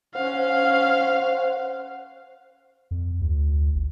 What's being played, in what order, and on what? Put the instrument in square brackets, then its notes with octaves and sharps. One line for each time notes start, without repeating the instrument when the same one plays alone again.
[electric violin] C#4 F5 [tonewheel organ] C5 F#5
[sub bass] F2
D2
G1